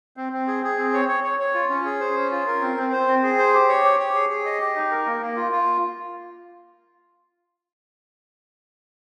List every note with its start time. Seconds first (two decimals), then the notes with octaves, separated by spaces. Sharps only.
0.17 C4
0.33 C4
0.47 G#4
0.63 G#4
0.78 C4
0.94 C#5
1.09 C#5
1.24 C#5
1.40 C#5
1.54 F4
1.70 C#4
1.85 G#4
2.00 C5
2.16 C#4
2.32 F4
2.47 A#4
2.62 C4
2.77 C4
2.92 C5
3.08 C4
3.23 G#4
3.38 C5
3.54 G4
3.69 C#5
3.84 G4
4.00 C#5
4.15 G#4
4.30 G#4
4.46 D#5
4.61 G4
4.76 D#4
4.91 A#4
5.06 A#3
5.21 A#3
5.37 F4
5.52 F4